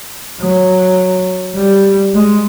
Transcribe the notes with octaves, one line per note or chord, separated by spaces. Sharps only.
F#3
G3
G#3